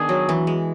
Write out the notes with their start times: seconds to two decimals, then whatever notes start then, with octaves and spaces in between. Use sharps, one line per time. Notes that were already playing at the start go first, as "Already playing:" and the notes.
Already playing: D#3 B3 D4 G#4
0.09 F#3
0.29 E3
0.47 G#3